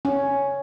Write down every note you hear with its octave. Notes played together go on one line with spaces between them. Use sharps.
C#4